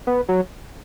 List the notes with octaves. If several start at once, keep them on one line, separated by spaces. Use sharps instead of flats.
B3
F#3